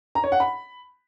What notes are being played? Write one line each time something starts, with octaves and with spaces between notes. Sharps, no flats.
A#5
C#5
F#5
B5